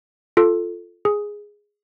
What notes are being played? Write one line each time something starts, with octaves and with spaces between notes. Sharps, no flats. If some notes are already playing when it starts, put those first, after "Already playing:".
F4 A4
G#4